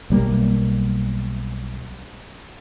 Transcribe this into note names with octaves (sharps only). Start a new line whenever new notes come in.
B1 G3 A#3